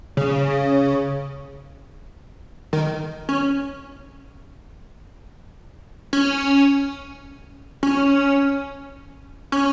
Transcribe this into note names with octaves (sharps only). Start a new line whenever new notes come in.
C#3
D#3
C#4
C#4
C#4
C#4